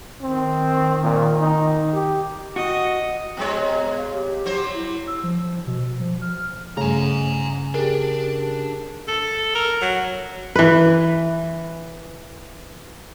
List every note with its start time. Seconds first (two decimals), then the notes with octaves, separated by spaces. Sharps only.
0.21 D#3 C4
1.03 A#2
1.41 D#4
1.94 G4
2.56 F#4 D#5
3.37 B2 G#3 C#5 A#5
3.97 F5
4.12 G4
4.46 F#3 C5
4.73 E4
5.07 E6
5.23 F3
5.67 B2
6.00 F3
6.22 F6
6.77 G2 C#3 A3 G#5 A#5
7.74 D4 G4 G#4 A#4
9.08 A4
9.55 A#4
9.82 F#3
10.55 E3 B4